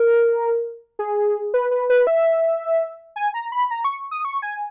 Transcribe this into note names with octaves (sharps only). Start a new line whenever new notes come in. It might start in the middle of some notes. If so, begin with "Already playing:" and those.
Already playing: A#4
G#4
B4
B4
B4
E5
G#5
A#5
B5
A#5
C#6
D#6
C#6
G#5